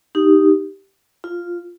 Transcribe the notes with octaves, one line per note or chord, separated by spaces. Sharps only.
D#4 G4
F4